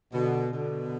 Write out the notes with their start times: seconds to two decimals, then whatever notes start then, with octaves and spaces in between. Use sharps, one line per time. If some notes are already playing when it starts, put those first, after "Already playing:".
0.13 B2 D3
0.51 B2 D3